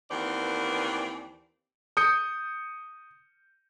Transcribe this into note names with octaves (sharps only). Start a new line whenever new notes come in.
D#2 E3 B3 C4 A#4 D5
D#6 G6 C#7